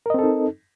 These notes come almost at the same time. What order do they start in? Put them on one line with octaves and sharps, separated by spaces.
A#4 D#5 C4 A4 D#4